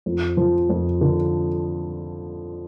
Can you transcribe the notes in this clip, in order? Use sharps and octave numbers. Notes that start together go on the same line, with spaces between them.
F2
F3
F2
D3